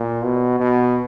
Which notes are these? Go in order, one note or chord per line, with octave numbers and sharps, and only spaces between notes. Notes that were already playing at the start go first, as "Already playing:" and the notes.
Already playing: A#2
B2
B2